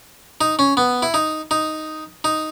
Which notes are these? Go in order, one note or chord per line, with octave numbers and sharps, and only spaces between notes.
D#4
C#4
B3
E4
D#4
D#4
D#4